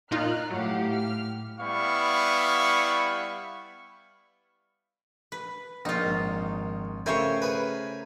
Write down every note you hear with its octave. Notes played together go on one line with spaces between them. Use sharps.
A#2 D#4 F4 A#5 F6 F#6
A2 F#3 G4 F5 F#5
F6
G3 B3 E4 F5 C#6
B4
A#1 D#4 F4
G#1
C#3 A3 A#4 C5 C#5 E5 G5 G#5
G#4 B4